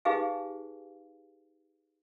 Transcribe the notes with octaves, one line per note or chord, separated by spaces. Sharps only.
D#4 G4 G#4 B4 F5 G#5